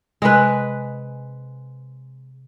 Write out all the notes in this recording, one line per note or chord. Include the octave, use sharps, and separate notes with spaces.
C3 G#3 B4 G#5 F#6